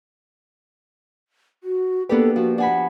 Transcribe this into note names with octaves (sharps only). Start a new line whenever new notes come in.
F#4
A#3 B3 D4 G4 A4 B4
F3 F#4
D4 F#5 G#5 B5